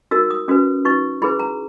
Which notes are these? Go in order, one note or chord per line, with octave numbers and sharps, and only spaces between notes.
D#4 F#4 A#4 E6
D#6
C#4 F#4 B4 D#6
D#4 F#4 B4 C#6
E4 G#4 B4 B5
A#5